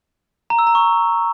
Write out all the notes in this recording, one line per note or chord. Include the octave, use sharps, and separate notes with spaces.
A#5
E6
A#5
C#6